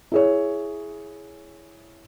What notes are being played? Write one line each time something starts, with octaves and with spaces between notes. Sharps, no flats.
E4 G#4 C#5